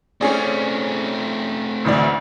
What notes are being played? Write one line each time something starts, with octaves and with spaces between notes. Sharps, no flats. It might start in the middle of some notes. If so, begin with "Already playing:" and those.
A3 C4 C#4 G#4 D5
A1 D2 D5